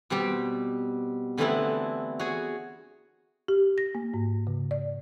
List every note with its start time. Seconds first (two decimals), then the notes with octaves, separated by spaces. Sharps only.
0.10 B2 G3 C4 G4
1.38 D3 E3 A3 B3 C4 E4
2.19 F#4 G#4 C#5
3.48 G4
3.78 A#6
3.95 A#3
4.14 G#2
4.47 C#3
4.71 D5